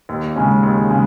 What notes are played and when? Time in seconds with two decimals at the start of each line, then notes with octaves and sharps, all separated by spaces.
0.09 D#2
0.36 C#3 G#3 C#4
0.63 D#2
0.90 C#3 G#3